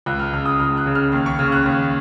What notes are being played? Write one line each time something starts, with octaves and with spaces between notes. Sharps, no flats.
C#2 F#6
F6
C#3 F6
D#6
C#2 F6
F#6
C#3
F6
D#2 F6
C#6
C#3 F6
F#6
D#2